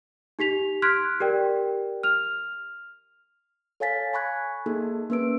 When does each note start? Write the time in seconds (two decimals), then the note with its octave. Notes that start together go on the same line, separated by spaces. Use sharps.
0.39 D#4 G4 B6 F7
0.82 C6 F6 F#6 G#6 B6 D7
1.20 G4 A#4 D5 G5
2.03 F6 F7
3.80 A4 C#5 F5 G#5 A6 B6
4.13 G#5 B5 C#6 F#6 G#6
4.66 A#3 D#4 G#4 A4
5.10 A#3 C#4 B4 E6 D7